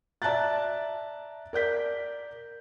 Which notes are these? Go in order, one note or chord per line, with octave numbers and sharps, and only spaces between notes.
D5 E5 A5 A#5 F#6 A6
A#4 D5 G6 B6